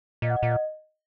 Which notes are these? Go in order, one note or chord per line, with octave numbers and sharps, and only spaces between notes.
A#2 D#5
F#5
D#5
A#2 F#5
D#5